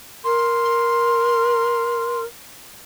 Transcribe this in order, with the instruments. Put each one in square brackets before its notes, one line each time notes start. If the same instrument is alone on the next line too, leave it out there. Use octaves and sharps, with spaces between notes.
[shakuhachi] A#4 [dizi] C6